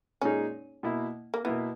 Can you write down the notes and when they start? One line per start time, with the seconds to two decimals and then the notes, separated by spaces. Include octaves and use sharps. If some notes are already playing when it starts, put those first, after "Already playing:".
0.21 A#2 G#3 C#4 D#4 G#4
0.83 B2 A#3 E4
1.34 A#3
1.45 B2 A#3 B3 E4